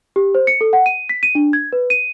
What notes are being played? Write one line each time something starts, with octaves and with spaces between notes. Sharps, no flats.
G4
C5
C#7
A4
F#5
D#7
B6
D#7
D4
G#6
B4
D#7